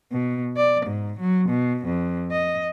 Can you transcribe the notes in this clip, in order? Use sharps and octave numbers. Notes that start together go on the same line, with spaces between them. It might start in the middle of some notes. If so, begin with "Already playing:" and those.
B2
D5
G#2
F#3
B2
F2
D#5